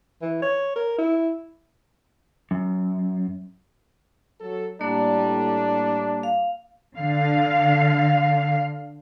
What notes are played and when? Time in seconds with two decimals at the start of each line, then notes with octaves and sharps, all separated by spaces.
0.22 E3
0.42 C#5
0.76 A#4
0.98 E4
2.51 F#2
4.40 F#3 A4
4.81 A2 G3 A#3 D4
6.23 F5
6.98 D3 F5